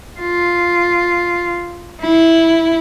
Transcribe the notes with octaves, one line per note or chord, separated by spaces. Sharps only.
F4
E4